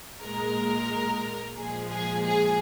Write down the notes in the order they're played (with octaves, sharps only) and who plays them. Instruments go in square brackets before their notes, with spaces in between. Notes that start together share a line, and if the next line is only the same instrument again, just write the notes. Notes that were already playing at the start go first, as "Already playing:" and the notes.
[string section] A#2 G#3 A#4
A#2 F3 G#3 G#4
G#4
G#4